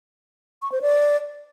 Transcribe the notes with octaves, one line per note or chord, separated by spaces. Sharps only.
C#6
C5
D5